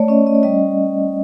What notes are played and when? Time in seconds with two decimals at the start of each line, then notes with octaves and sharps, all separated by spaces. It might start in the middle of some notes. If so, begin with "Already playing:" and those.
Already playing: A3 C#5 D5
0.08 C#4 D#5
0.27 D#5
0.35 D5
0.43 G3 D#5